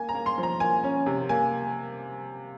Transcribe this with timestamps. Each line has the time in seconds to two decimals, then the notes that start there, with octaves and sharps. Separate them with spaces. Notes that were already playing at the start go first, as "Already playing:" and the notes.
Already playing: A#3 G#5
0.09 A#5
0.15 A#3
0.26 C6
0.38 F3
0.43 A#5
0.60 A#3 G#5
0.84 C#4
1.06 C3
1.29 A#3 G#5